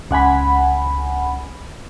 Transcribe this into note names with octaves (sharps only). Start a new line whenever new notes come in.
C#2 F#5 G#5 B5